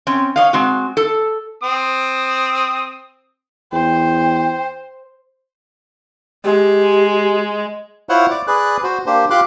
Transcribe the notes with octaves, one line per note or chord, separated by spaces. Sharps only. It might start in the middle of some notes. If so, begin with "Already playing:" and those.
C4 C#4
C#5 D#5 F5
G#3 C4 F#4
A4
C4 D#6
E2 C5 G5
G#3 G4
E4 F4 C5 C#5 F#5
D5 D6
G#4 B4 D5 F#6
F#4 C5
A#3 D4 G4 C5
F4 G4 C6 D6 F#6